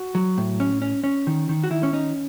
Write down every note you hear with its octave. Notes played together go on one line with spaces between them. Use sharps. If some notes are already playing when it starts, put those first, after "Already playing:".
Already playing: F#4
F#3
A2
C#4
C#4
C#4
D#3
D#3
F#4
D#3 E4
C#4
C#4 D#4